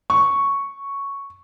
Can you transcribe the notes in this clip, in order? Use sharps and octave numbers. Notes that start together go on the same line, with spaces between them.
C#6